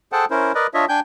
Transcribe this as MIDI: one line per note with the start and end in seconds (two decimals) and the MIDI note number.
0.12 0.25 68
0.12 0.25 69
0.12 0.25 72
0.12 0.25 78
0.12 0.25 79
0.12 0.25 81
0.31 0.52 61
0.31 0.52 64
0.31 0.52 70
0.31 0.52 72
0.55 0.67 70
0.55 0.67 71
0.55 0.67 74
0.55 0.67 75
0.74 0.85 62
0.74 0.85 65
0.74 0.85 73
0.74 0.85 75
0.74 0.85 76
0.89 1.00 62
0.89 1.00 79
0.89 1.00 80
0.89 1.00 91